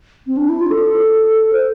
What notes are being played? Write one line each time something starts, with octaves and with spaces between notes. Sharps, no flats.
C4
D4
E4
F4
A4
C5